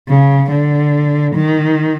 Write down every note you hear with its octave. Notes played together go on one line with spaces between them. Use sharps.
C#3
D3
D#3